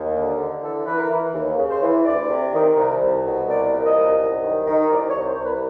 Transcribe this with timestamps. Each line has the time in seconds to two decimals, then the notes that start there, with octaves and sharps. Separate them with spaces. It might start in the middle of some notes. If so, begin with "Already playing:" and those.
Already playing: D#2
0.15 D3
0.38 D3
0.62 E3 A4
0.86 E3 B4
0.98 A#4
1.10 E3
1.34 D#2
1.57 C#3
1.69 C5
1.82 E3
2.05 D2 D5
2.29 C3
2.53 D#3
2.76 C2
3.00 C2
3.24 B2
3.48 C2 D5
3.73 A#2
3.85 D#5
3.96 C2
4.19 F#2
4.43 D#3
4.67 D#3
4.91 C2 D5
5.09 C#5
5.16 C2
5.27 C5
5.39 C2
5.45 B4